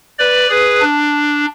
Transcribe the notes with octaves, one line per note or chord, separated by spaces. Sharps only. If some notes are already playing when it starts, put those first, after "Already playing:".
B4 D5
G#4 B4
D4